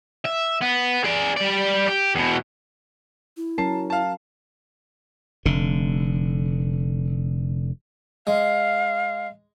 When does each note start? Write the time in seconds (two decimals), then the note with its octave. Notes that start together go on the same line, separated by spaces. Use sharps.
0.25 E5
0.61 B3
1.04 G#4 D5
1.37 G3 D5
1.88 G4
2.15 E2 B2
3.37 E4
3.58 F#3 C#4 A#4 A5 C7
3.90 F5 A5
5.45 F1 D3
8.27 G#3 F5